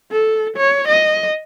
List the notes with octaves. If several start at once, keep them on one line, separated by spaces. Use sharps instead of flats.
A4
C#5
D#5